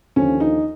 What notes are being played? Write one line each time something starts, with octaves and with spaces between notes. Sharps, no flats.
D#2 D3 F3 C#4
D#4